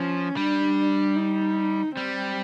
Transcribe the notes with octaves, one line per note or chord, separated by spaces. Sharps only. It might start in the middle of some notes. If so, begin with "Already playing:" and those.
Already playing: F3 C#4
G3 D4
D#4
G3 C4